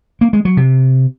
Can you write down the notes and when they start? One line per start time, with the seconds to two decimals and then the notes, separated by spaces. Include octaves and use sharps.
0.21 A#3
0.33 G#3
0.45 F#3
0.57 C3